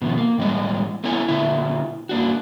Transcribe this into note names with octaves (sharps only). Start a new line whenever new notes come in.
B2 D#3 F3
A#3
A2 E3 G3 G#3 D#5
A3 B3 C4 E4 C#5 G#5
A#2 D3 E4 E5
A#3 D4 F#4